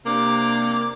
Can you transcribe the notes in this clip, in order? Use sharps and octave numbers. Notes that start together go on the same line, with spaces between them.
C3 A#3 D4 D6